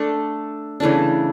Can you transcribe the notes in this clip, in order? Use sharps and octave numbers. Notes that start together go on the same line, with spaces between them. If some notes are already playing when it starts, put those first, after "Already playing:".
Already playing: A3 D4 A4
C#3 E3 A3 D4